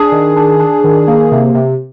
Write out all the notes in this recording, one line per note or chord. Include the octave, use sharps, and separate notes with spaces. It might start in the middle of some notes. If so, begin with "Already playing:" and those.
Already playing: D4 G#4
D#3
D4
D4
D#3
A#3
C3
C3